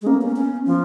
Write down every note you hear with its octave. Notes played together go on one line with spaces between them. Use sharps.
G#3
A#3 C#4
B3
A#3 C#4
B3 C#4
F3 C#4